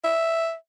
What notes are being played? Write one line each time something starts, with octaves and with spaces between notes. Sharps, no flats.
E5